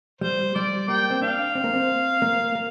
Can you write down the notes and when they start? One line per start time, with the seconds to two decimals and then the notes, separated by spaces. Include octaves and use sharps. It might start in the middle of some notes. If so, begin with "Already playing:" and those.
0.21 G3 C5
0.55 G3 D5
0.88 A#3 G5
1.10 C4
1.22 D4 F5
1.55 C4
1.64 A#3
1.74 C4
2.22 A#3
2.55 A#3